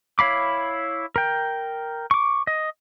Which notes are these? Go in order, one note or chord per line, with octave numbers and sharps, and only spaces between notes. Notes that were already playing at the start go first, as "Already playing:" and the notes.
E4 C#5 F5 B5 D6
A#4 G5
C#6 D6
D#5